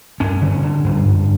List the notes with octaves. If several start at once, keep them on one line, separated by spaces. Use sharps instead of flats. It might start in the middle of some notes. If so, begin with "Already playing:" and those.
G2 C#4
D3
D3
G2
G2